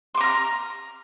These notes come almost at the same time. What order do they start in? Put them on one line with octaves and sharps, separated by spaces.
C6 D6 A#5 F6